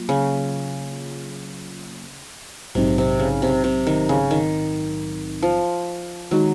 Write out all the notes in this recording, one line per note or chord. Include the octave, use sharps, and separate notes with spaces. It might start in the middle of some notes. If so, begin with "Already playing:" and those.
Already playing: F#3 A#3 F4
C#3
A#1 G#2 C3 F#3 C4 D#4
C3
C#3
C3
C3
D#3
C#3
D#3
F3
D#3 F#3 G#3 D#4 F#4